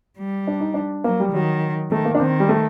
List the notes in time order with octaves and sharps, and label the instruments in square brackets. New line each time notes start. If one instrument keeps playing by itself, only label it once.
[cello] G3
[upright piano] D4
D#4
D4
[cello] F#3 [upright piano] A#3
[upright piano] G3
[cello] D#3 [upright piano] F#3
[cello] D#3 [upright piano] A3
[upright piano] A#3
D4
[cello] D#3 [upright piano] C4
[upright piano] G3
A3